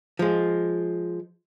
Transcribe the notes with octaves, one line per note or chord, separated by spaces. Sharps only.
F3 G#3